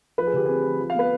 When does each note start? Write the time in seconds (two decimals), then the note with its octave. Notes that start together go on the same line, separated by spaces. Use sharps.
0.18 F3 B4
0.27 G#4
0.33 D3 G4
0.46 C4 G#4
0.64 F3
0.80 F3
0.90 F5
0.94 B3
0.99 B4